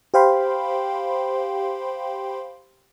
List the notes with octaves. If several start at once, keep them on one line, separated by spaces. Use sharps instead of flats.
G4 C5 F5 G5 B5 C6